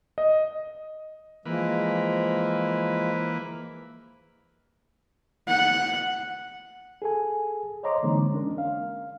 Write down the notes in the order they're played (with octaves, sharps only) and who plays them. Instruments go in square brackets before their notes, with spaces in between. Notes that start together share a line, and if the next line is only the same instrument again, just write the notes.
[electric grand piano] D#5
[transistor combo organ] E3 A#3 B4 [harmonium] F3 G#3
[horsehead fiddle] F#5
[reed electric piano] G#4 A4 G#5
C5 C#5 D#5 A#5 C6 D6
D3 E3 G#3 A#3 C4 D#4
C#4 D4 A#4
F5